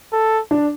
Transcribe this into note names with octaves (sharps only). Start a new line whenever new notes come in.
A4
D4